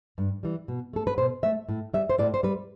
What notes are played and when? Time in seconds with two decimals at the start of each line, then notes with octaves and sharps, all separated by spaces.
0.18 G2
0.43 E3 G3
0.68 B2
0.93 A3 A4
1.07 B4
1.18 B2 C5
1.43 A3 E5
1.69 A2
1.94 G3 E5
2.10 C5
2.19 A2 D5
2.34 C5
2.43 G3 B4